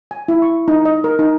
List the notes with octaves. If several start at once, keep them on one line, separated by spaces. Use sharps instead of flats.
G#5
E4
C#6
D#4
D#5
A#4
D#4